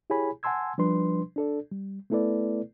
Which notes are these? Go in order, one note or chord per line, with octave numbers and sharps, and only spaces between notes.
E4 G4 G#4 C#5 G#5 B5
F#5 G#5 A5 C6 E6 G#6
F3 G3 D4 B4 C6
D4 A4 D5
G3
A3 B3 E4 A4 B4 D5